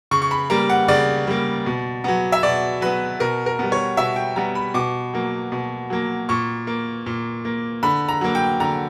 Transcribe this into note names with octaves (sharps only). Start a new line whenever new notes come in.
C#3 C#6
C#6
B5
G3 A#3 A#5
F#5
C#3 D5
G3 A#3
B2
F#3 B3
E5
B2 D5
F#3 B3 B4
B2 A#4
A#4
G3 B3
C#5
B2 E5
G5
G3 B3 A#5
B5
B2 D6
F#3 A#3
B2
F#3 A#3
A#2 C#6
A#3
A#2
A#3
D3 B5
A#5
F#3 A#3
G5
D3 A#5